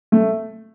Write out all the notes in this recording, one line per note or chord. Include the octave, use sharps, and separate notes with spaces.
A3